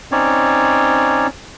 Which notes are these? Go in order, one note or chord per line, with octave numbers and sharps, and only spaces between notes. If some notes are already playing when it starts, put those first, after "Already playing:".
C4 C#4 D#4 C#5 D5